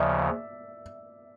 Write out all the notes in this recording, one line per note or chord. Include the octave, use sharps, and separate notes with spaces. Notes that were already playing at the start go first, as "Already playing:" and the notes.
Already playing: D#2 C#3 F3 D5 E5